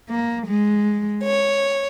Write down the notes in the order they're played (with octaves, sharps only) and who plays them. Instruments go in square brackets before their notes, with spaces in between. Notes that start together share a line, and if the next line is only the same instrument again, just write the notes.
[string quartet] A#3
G#3
C#5